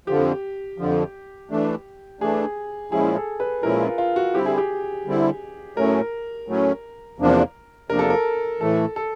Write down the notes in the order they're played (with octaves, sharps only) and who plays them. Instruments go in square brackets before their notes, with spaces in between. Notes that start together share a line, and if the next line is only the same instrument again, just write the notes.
[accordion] F2 D3 F3 [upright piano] G4
[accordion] F2 D3 F3
E3 A3 D4
[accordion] E3 A3 D4 [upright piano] G#4
[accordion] A#2 F3 G#3 C#4 E4 [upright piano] G#4
[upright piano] A4
B4
[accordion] A#2 F3 G#3 C#4 E4 [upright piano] A#4
[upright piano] F4
F4
F#4
[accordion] D3 G3 C4 E4 [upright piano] G4
[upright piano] G#4
G4
[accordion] D3 G3 C4 E4
[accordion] A2 F#3 A3 C#4 [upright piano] A#4
[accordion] A2 F#3 A3 C#4
E2 C3 F3 A#3 D4
[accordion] E2 C3 F3 A#3 D4 [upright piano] A#4
[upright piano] A4
A#4
[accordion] A2 E3 A3 [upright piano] A4
[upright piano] A4